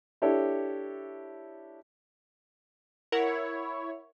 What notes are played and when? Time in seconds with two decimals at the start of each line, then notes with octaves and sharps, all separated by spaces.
0.22 D4 E4 G4 A4 C#5
3.12 E4 A#4 C#5 F#5